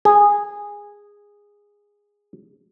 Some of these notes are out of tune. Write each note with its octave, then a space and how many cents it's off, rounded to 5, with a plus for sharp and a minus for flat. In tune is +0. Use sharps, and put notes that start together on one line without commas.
G#4 -15